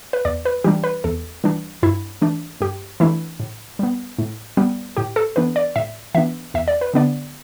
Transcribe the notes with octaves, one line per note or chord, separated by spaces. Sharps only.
B4
E2 D5
B4
E3 G3 D4 G4
B4
E2 A4
E3 G3 D4
G2 E4
E3 A3 D4
G2 G4
E3 A3 D4 E4
A2
G3 B3
A2
G3 B3
A2 G4
A4
E3 B3 D4 B4
D5
A2 E5
E3 B3 D4 E5
E2 E5
D5
B4
D3 B3 D4 D5